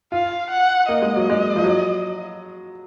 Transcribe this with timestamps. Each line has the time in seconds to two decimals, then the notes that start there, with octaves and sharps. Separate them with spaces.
0.12 F4 F5
0.50 F#5
0.88 A#3 D#5
1.02 G#3
1.16 F#3
1.30 G#3
1.56 F3
1.64 F#3